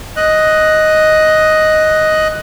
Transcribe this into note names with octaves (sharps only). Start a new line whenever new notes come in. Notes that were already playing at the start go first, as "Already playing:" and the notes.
D#5 F#6